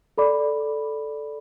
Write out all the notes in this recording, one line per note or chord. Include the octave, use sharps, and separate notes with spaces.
A4 D5 B5 D6